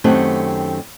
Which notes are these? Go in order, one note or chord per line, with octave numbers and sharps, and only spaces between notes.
F#2 D#3 A3 C4 G4 F#5